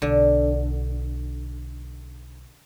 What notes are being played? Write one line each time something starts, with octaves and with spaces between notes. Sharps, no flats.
B1 D3